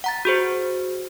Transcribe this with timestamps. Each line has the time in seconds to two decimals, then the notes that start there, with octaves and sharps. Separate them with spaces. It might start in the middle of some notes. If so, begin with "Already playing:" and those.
0.04 F#5 A#5 A6
0.25 F#4 G#4 C5